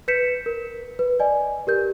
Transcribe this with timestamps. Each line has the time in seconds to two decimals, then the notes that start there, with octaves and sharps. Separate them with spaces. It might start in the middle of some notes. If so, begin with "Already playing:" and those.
0.08 B4 G6 B6 C#7 E7
0.46 A#4
0.99 B4
1.20 D5 D#5 G#5
1.67 G4 A#4 G6